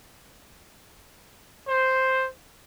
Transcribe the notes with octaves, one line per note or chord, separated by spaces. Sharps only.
C5